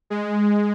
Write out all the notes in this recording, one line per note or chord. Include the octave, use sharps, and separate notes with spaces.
G#3